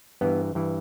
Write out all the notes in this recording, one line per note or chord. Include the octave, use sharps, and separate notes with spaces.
G2 E3 B3
G2 E3